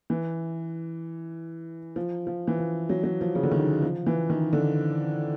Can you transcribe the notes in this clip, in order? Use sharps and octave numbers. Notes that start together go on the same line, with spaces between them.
E3
F3
F3
E3
F3
F#3
F#3
F3
C#3
D3
D#3
F3
E3
D#3
D3